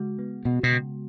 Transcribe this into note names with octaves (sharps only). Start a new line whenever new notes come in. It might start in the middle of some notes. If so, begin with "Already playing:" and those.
Already playing: C#3 G#3 F#4
B3
B2 F#4
B2
C#3